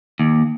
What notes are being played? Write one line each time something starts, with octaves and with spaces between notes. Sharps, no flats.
D#2